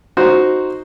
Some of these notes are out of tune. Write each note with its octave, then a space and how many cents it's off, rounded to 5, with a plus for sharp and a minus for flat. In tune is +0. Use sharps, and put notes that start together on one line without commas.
D#4 +0 F#4 +0 C5 +0